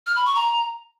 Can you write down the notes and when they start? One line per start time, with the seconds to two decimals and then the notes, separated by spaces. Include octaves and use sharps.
0.06 F6
0.16 B5
0.26 C#6
0.35 A#5